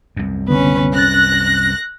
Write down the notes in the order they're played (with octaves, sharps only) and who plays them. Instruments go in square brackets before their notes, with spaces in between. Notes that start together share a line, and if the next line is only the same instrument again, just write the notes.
[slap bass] C2 F#2
[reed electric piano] D3 B3 [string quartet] C#4 B4
[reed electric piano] C#4 A6 [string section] F#6 [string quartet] A#6